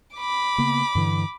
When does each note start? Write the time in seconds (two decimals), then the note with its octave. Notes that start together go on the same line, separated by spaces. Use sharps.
0.16 B5 D6
0.58 C#3 A#3 B3
0.95 G2 D3 E3